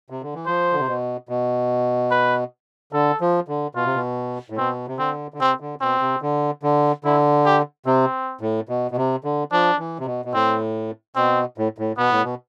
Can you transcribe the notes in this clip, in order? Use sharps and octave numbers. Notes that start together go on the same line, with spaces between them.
C3
D3
E3
F3 C5
D3
C3
B2
B2
B4
D3 A4
F3
D3
B2 F4
C3
B2
A2
B2 C4
C3
D3 C4
D3
C3 C4
D3
B2 C4
C3
D3
D3
D3 E4
G4
C3 C4
A2
B2
B2
C3
D3
F3 D4
E3
C3
B2
B2
A2 C4
B2 C4
A2
A2
B2 B3
A2
B2